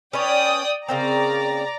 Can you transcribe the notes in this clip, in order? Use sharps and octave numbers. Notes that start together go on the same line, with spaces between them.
C#4 B4 C#5 D5 G5 D#6
C#3 A#3 C4 D5 A#5